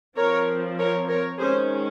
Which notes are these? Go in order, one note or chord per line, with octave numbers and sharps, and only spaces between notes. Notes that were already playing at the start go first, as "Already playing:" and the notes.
F3 C4 A#4 C#5
A#4 C#5
A#4 C#5
D#3 G#3 C#4 G#4 C5